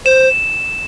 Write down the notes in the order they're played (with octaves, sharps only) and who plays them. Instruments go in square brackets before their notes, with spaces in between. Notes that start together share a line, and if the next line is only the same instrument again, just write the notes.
[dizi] C5 [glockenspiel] E7